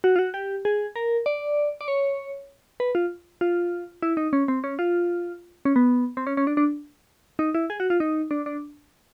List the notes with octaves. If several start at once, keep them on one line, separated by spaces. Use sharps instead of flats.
F#4
F4
F#4
G4
G#4
A#4
D5
D5
C#5
B4
F4
F4
E4
D#4
C#4
C4
C#4
F4
C#4
B3
C4
C#4
C#4
D4
D4
D#4
E4
G#4
F#4
F4
D#4
D4
D4